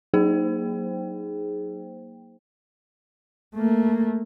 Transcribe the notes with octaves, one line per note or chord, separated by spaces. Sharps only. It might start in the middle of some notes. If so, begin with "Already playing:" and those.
F#3 A#3 D#4 G#4 C5 G5
A3 A#3